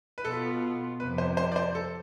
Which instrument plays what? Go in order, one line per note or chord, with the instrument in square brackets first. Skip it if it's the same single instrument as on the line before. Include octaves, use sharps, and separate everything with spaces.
[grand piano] B4
[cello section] B2 B3 F4 [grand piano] A4
[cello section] F2 C3 F3 [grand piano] B4
[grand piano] C5
C5
D5
C5
A4